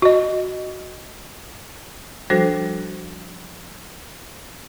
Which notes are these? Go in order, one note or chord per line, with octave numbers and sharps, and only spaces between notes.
F#4 D#5
F3 G3 D4 F#4 A4 C5